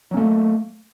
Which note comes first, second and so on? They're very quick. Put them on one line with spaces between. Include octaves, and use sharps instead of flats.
F#3 C#4 A3 A#3